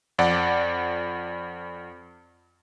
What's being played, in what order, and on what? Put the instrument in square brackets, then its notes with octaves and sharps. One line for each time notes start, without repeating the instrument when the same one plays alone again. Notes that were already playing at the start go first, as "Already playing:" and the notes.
[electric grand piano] F2 D5 F#5